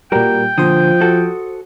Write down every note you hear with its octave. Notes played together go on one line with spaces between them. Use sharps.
A#2 G3 F#4 A#4 G5
A#2 D3 F3 C5 D#6
F#4 A4